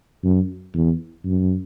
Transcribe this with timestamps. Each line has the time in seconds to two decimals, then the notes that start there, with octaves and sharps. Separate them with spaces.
0.24 F#2
0.75 E2
1.24 F#2